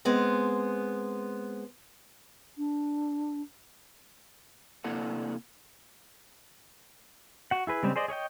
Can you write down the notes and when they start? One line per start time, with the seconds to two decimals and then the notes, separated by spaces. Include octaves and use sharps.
0.05 G#3 B3 C4
2.57 D4
4.84 C3 A#3 D4 E4 A4 F#5
7.51 F#4 F#5
7.67 E4 G#4 B4
7.83 C#3 G3 G#3 C4
7.96 G#4 C5 D5 D#5
8.08 G#4 C#5 D#5 G5